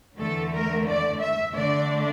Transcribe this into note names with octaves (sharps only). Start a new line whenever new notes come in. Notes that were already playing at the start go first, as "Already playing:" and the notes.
E2 D3 A3 A4
A#4
D5
E5
D3 A3 D4 D5